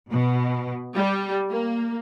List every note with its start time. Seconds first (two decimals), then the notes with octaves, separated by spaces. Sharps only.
0.11 B2
0.95 G3
1.51 A#3